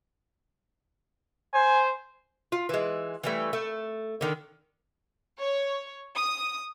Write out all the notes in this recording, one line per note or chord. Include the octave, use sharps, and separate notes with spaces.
C5 G#5
F4
E3 G#3
E3 G3 A3
A3
D3 D#3
C#5
D#6